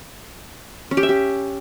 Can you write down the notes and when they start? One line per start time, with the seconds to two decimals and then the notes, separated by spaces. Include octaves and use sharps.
0.91 C#4
0.97 G4
1.03 E5
1.09 G4